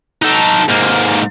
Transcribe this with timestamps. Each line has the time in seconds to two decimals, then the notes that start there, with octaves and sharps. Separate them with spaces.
0.22 D#4 A4
0.68 G#2 A#3